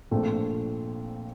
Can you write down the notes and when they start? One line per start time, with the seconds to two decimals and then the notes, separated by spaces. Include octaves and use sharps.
0.11 A#1 A#2 A3 C4